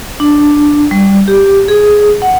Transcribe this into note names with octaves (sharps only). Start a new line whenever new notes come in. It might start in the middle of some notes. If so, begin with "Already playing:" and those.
D4
G3
G4
G#4
F#5